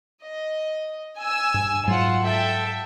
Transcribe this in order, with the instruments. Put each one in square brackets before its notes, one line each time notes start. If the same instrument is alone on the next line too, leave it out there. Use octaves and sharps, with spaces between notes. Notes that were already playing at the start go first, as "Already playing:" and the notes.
[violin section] D#5
G#5 E6
[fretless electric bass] G2
[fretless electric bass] G#2 F#3 [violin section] F4 F#5
[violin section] A4 E5 G5